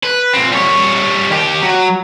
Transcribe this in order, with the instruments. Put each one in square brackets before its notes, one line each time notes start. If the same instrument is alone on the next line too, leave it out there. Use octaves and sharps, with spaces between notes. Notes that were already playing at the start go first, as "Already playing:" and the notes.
[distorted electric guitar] B4
A#2 C4
G3 C#5
D#2 G4
F#3